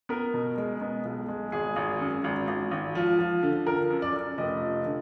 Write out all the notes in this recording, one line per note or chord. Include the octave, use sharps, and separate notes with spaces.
B3 A#4
B2
G#3
B3
B1
G#3
G#1 G#4
G#1
F#2
G#1
G#1
G#1
F3
F3
D3
F3 A#4
F#2
D5
F#2
F1 D#5
F3
D3